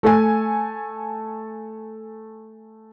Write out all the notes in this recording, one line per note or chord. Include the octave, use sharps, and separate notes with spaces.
A3 A4 G#5